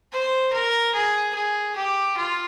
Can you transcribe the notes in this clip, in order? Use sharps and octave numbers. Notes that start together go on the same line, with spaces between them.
C5
A#4
G#4
G#4
G4
F4